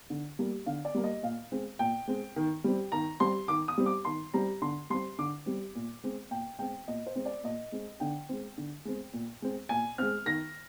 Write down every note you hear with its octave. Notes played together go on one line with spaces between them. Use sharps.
D3
G3 A#3
D3 F5
D5
G3 A#3
D#5
A#2 F5
G#3 C4
A#2 G5
G#3 C4
D#3
G3 C4
D#3 A#5
G3 C4 C6
D#3 D6
D#6
G3 C4
D6
D#3 C6
G3 C4 A#5
D3 C6
G3 C4 C6
D3 D6
G3 C4
A#2
G#3 C4
A#2 G5
G#3 C4 G5
A#2 D#5
C5
G#3 C4
D5
A#2 D#5
G#3 C4
D3 G5
G#3 C4
D3
G#3 C4
A#2
G#3 C4
A#2 G#5
G#3 C4 F6
D#3 A#6